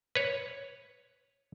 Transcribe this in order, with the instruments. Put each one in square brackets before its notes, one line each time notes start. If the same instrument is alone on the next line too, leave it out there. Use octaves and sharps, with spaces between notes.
[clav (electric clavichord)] B4 C#5